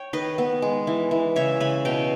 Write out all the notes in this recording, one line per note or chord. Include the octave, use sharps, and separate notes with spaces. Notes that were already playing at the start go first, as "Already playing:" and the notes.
Already playing: C#5 G5
D#3 B4 D#5
B3
G#3
E3
E3
C#3 C#5 E5
C#3 G#5 B5
B2 G5 A#5